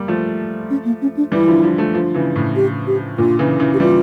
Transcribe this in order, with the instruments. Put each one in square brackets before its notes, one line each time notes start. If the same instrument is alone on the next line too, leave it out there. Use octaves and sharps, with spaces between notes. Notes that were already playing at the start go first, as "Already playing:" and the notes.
Already playing: [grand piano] G3 A#3
F3 A3
[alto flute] C#4
A#3
C#4
D4
[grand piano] E3 G3 [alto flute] E4
[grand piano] D3 F3
D3 F3
F3 A3
D3 F3
C#3 E3
A2 C#3
[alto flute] G4
G4
[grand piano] A#2 D3 [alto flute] F4
[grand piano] C#3 E3
C#3 E3
[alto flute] G4
[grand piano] E3 G3 [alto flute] F4